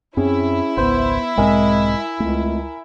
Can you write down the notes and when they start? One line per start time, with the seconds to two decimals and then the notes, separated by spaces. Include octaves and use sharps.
0.17 F#2 C4 C#4 E4 G#4
0.77 G#1 C#2 B3 C5
1.38 B1 G#2 G#3 C4 A#4 G#5
2.20 C#2 A3 C4